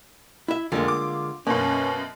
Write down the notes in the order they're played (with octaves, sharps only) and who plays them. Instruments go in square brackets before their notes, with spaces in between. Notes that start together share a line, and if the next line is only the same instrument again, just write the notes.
[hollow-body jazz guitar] E4 E5
[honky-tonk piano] F1 [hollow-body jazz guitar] D3 G#3 A#3 [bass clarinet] F4
[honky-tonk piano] D6
[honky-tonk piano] F#2 B2 [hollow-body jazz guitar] A#3 [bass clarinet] C#4